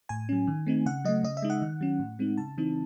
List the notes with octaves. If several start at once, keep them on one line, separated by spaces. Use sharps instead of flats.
A2 G#5
F#3 C#4
D#3
A3 C4 D#4
C#3 F#5
F#3 A3 D#5
C#3 D#5
E5
G#3 D#4
F#5
D#3
F#3 C#4
A2
G#3 C4 D#4
C#3 A5
E3 C4 D#4